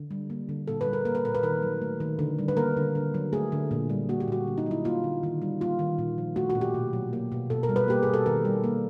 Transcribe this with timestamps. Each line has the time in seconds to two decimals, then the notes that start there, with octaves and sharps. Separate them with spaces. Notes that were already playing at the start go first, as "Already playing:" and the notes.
Already playing: D3
0.11 G3
0.30 A#3
0.49 D3
0.68 A#2 A4
0.81 B4
0.87 G3
0.93 A#4
1.05 A#3 A#4
1.15 B4
1.25 A#2 A#4
1.35 B4
1.43 D#3 A#4
1.62 F#3
1.82 A3
2.00 D#3
2.19 D3
2.39 G3
2.48 B4
2.57 A#3 A#4
2.77 D3
2.95 D3
3.14 F#3
3.33 A3 G#4
3.52 D3
3.71 A#2
3.90 G3
4.09 A#3 F#4
4.20 G4
4.28 A#2 F#4
4.47 D3
4.58 D#4
4.66 F#3 E4
4.85 A#3 F4
5.04 D3
5.23 D#3
5.42 G3
5.61 A#3 F4
5.79 D#3
5.98 A#2
6.18 F3
6.36 A3 F#4
6.50 F#4
6.55 A#2
6.61 G4
6.74 B2
6.93 F#3
7.13 A#3
7.32 B2
7.50 B2 A4
7.63 A#4
7.69 G3
7.76 B4
7.88 A#3 G4
8.03 B2 G#4
8.14 A4
8.26 D#3 A#4
8.45 G3
8.64 A#3